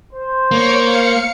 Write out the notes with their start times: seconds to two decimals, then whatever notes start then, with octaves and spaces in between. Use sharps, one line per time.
0.13 C5
0.51 A#3 C#5 C#7
0.84 F5 C#7